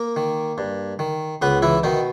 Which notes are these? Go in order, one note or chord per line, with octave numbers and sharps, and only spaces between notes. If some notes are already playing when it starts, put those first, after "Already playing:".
Already playing: A#3 A#4
D#3
G2
D#3
C#2 B3 B4
E3 E4
B2 D#3 D#4